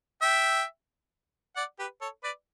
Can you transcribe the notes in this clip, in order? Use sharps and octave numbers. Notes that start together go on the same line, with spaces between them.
E5 G5
D5 F#5
G4 B4
A4 C#5
B4 D5